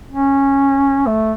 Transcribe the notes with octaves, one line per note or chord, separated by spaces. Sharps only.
C#4
A3